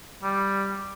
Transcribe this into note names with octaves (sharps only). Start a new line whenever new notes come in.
G3